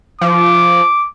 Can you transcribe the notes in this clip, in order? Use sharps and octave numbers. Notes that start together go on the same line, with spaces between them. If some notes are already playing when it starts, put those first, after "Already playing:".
F3 D6